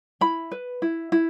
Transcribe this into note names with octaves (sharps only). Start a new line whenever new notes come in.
E4 B5
B4
E4
E4